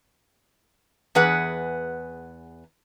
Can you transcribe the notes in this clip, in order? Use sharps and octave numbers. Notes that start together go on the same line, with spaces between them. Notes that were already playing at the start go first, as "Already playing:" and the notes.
E2 G#4 B4 F#5